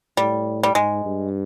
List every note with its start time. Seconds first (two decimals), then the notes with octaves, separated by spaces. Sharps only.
0.17 A2 G3
0.63 G3
0.75 G#2 G#3
1.05 G2